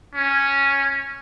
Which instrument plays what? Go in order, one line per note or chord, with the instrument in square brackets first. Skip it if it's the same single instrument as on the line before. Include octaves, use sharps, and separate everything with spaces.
[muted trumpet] C#4